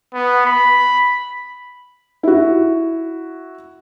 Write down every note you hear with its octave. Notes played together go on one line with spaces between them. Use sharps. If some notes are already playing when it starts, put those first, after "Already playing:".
B3
B5
E4 F#4